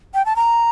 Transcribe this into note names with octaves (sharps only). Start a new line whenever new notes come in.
G5
A5
A#5